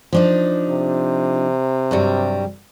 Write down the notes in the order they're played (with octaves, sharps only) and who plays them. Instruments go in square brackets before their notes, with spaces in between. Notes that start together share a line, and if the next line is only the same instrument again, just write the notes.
[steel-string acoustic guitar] F3 D4 D#4
[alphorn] C3
[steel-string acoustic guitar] G2 F#3 G3